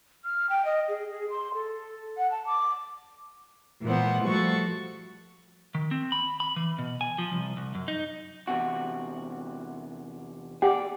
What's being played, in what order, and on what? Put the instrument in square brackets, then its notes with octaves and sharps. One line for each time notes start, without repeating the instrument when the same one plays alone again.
[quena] F6
G5
D#5
G#4
G#4
C6
A4
F#5
A5
D6
[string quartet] A#2 E3 G#3 B3 C5 F#5
F3 G3 A3 F#4 A4 C#6
[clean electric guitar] D#3
C4
B5
B5
E3
B2
G#5
F3
C2
C2
F#2
D#4
E2 C3 F#4
[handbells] G4 F#5 G5 [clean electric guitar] G#4 D5